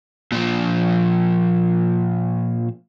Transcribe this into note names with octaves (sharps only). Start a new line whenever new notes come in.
A#2 F3